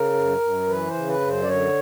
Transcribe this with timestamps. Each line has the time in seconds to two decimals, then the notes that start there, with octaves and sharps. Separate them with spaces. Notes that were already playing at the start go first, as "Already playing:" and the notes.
Already playing: C#3 A#4
0.14 F#2
0.40 F#2
0.67 E3 B4
0.87 C5
0.94 C#3
1.07 B4
1.21 F#2
1.28 C5
1.42 D5
1.48 D3 C#5